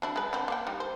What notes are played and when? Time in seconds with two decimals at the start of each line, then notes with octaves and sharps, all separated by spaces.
0.02 F#3 D4 E4
0.16 G#3 B4
0.33 D3 C4
0.48 A#3 C5 G5
0.67 G3 D#4
0.80 C5